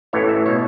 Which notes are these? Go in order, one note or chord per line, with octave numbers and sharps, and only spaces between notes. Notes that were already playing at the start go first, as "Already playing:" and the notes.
A1 A2 E3 C#5
E5
B2 C#5